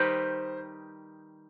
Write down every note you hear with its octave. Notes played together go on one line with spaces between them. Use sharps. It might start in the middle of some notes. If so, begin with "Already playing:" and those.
Already playing: D#3 G3 D#4 G4 B4 C5